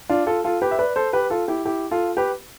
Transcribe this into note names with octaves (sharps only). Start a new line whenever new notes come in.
D4 F4
F4 A4
F4 A4
G4 B4
E5
B4 D5
A4 C5
G4 B4
F4 A4
E4 G4
E4 G4
F4 A4
G4 B4